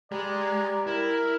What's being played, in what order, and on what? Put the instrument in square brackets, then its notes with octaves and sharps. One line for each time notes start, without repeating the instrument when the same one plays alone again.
[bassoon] G3 [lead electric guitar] G#3 [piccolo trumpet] D5 [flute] A#5
[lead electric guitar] E4 [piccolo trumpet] A#4